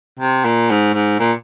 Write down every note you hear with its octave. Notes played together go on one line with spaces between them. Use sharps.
C3
A#2
G#2
G#2
A#2